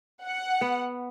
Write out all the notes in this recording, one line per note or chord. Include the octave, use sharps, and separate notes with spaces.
F#5
B3